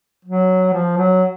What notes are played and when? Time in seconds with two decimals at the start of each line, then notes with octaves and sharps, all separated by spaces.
0.25 F#3
0.73 F3
0.97 F#3